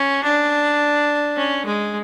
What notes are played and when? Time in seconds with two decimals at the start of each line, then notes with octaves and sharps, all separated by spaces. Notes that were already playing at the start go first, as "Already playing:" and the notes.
Already playing: C#4
0.24 D4
1.36 C#4
1.65 G#3